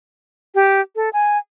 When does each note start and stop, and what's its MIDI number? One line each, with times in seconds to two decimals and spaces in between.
0.55 0.81 67
0.96 1.09 69
1.13 1.38 80